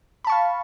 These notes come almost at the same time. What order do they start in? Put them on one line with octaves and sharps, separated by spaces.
B5 A5 C#6 F5